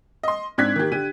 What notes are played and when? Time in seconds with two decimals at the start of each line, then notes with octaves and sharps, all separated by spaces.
0.23 D#5 C6
0.58 G#2 C4 D4 F#6 G#6 B6
0.76 D#3 A#3 G4
0.92 D3 G4 D#7